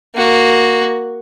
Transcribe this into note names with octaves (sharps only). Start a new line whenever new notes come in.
A#3 F#4